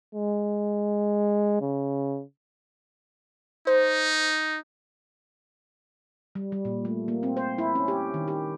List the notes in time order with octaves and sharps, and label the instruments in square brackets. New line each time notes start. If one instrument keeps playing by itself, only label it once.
[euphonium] G#3
C#3
[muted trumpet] D#4 [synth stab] C5
[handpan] G3
G3
A#2
A3
A#3
C4
C5
E4
C#4
G4
D#3
G4